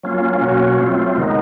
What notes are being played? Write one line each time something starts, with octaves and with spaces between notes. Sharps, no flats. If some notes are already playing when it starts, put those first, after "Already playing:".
F#3 A#3 C#4 F4
B2 F#3 A#3 C#4 F#4
F#3 A3 C4 F4
C3 D#3 G#3 B3 D#4